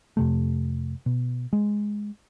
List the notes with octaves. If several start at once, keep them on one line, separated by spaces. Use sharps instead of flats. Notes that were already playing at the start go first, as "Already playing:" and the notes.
F2 C3 A3
B2
G#3